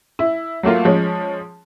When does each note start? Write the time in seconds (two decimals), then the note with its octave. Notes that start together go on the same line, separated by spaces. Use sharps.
0.19 E4
0.63 F#3 A3 A#3 F4
0.85 F3 G#3 C#4